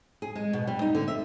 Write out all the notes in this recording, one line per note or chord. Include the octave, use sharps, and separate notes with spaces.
G#4
G#3
B2
G3
D#4
D3
E5